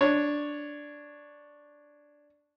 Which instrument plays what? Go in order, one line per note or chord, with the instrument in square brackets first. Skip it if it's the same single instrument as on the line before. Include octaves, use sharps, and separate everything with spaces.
[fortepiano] D4 C#5